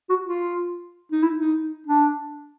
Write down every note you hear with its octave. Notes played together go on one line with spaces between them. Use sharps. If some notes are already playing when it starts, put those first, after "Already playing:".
F#4
F4
D#4
E4
D#4
D4